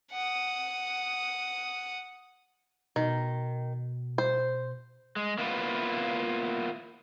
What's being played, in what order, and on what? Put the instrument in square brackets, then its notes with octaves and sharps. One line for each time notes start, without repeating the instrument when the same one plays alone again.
[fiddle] F#5 D#6
[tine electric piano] B2 [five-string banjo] D#3
[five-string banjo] C5
[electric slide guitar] G#3
A#3 B3 E4 F4 B4